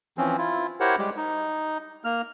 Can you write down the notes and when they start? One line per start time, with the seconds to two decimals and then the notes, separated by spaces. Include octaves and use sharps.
0.18 E3 F3 C4 C#4
0.38 E4 F4
0.80 E4 G4 A#4 C5 C#5 F#5
0.98 G3 G#3 G4
1.17 D#4
2.04 A#3 F6